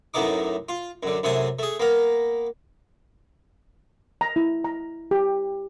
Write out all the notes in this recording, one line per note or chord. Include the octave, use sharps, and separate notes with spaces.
F#2 A2 A3 B3 D#4 D6
F4
F#2 D3
F#2 C3 A3 G#5 D#6
A3 G#4
A#3 B3 A#4
A#5
E4
A#5
G4